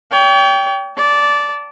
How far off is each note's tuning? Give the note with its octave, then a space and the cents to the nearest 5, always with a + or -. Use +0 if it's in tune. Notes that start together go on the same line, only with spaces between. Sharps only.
C#5 +45 G5 +0
D5 -15 A5 +5